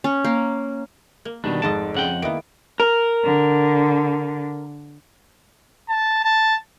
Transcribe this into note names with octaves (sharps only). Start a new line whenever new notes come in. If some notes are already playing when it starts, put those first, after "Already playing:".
C#4
A#3
A#3
B2 D#3 G3 D4
F1 G#2 G#3 A4 D#5 A5 D7
F2 C#3 F#5 G5
D#3 A#3 B3 E4 D7
A#4
D3
A5
A5